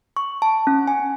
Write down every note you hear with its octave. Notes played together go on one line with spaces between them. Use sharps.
C#6
A5
C#4
G#5